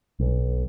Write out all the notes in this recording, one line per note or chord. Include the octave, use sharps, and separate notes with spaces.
B1